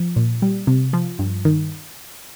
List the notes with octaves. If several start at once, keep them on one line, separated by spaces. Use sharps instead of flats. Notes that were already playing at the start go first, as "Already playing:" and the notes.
Already playing: F3
A#2
G3
C3
F3
G2
D#3